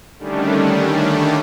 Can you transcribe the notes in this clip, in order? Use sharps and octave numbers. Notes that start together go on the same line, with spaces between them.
D3 D#3 G3 A3 C#4 D4